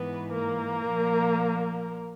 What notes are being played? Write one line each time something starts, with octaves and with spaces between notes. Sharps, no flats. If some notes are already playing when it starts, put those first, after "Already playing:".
Already playing: G#2 E3 B3 B4
A#3 A#4
A#2 F3